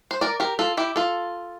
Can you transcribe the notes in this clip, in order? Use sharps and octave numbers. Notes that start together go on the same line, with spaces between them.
C5
A#4 D5
G4 A#4
F4 A4
E4 G4
F4 A4